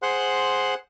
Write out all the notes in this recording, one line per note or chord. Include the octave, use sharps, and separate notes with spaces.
G#4 C5 F#5 C6 F#6